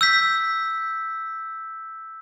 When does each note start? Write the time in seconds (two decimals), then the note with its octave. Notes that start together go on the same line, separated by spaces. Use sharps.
0.01 E6 G6 B6